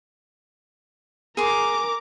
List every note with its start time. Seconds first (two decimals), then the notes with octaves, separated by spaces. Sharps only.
1.37 G#4 A#4 C6 D6